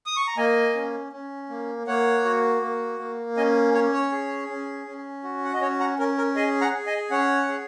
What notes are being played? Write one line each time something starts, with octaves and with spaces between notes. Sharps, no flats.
D#6
C#6
A#5
A#3 D#5 G#5
C#4
C#4
A#3
A#3 C#5 F#5
F#4
A#3
A#3
C#4 D#5 G#5
C#4 C#5
C#5
G#4
C#4
C#4
F#4
F#5
D#5
C#4 C#5
F#5 A#5
C#4 A#4
A#4
G#4 D#5 G#5
F#5 A#5
G#4
D#5 G#5
C#4 C#5 F#5
G#4